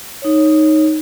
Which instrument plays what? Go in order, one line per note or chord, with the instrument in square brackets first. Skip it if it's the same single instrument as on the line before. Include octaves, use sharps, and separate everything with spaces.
[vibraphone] D#4 C#5